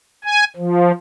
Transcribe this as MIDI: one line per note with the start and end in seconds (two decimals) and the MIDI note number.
0.24 0.44 80
0.56 0.92 53